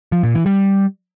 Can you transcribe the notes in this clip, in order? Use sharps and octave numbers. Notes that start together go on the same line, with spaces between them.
F3
A#2
E3
G3